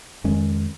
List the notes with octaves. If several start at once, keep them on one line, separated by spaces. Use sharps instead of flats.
F2 D#3 G#3 C#4